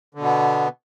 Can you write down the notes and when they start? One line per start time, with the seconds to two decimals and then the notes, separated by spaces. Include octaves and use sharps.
0.15 D3
0.19 B2
0.23 B3